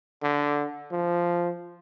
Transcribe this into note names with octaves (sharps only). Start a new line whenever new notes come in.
D3
F3